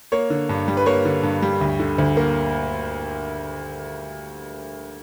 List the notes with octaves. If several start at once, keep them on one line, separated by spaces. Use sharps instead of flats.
A#3 C#5
D3
G2
G3
B4
A#3 C#5
D3
G2
G3
D2
D3
D2
A#3